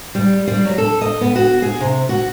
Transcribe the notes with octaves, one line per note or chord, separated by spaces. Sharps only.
G3
G3
F#3
A4
D#5
B3
F#4
G#4
C3
F#4